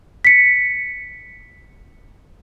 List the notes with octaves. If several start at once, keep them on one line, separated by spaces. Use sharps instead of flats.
B6 C#7